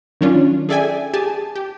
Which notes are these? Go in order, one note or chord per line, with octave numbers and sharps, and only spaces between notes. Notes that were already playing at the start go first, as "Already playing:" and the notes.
D#3 F#3 C#4 D4 F4
G#4 A4 D5 E5 G5 G#5
G4 G#4 G#5 A5
G4